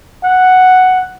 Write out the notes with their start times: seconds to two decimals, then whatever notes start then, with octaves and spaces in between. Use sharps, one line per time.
0.24 F#5